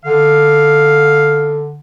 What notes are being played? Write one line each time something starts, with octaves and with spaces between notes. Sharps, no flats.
D3 F5